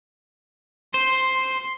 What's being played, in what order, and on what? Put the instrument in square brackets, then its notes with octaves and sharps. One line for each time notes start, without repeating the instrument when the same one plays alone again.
[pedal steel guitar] C5 [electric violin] C6